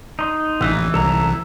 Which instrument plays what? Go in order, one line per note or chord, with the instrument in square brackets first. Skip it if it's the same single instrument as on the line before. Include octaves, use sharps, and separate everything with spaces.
[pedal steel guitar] D#4 C6
[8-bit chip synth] A1 [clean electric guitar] E3
[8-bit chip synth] C2 [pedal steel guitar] A4 A#5